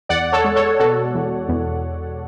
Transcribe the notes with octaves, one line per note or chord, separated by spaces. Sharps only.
E2 D5 F#5
A4 C#5
G#3
A4 C#5
B2 F#4 A4
E2
E2